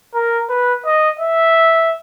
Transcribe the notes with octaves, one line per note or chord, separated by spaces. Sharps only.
A#4
B4
D#5
E5